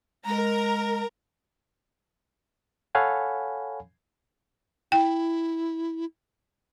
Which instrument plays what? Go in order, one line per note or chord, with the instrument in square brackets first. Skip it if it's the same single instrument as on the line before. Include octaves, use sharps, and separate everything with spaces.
[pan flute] G#3 [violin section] A#4 A#5
[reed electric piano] A4 C#5 F5 F#5 G#5 B5
[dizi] E4 [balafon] G5